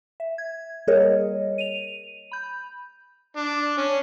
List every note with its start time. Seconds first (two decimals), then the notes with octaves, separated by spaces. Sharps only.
0.20 E5
0.38 G#6
0.87 G3 A#3 G#4 A#4 C#5 D#5
1.58 D#7 F7
2.32 B5 G6
3.37 D4
3.78 C#4